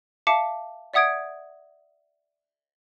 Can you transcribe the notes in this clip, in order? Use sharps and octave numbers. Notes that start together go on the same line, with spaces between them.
E5 F5 A5 D6 C#7
D5 E5 F#5 D#6 G#6 D7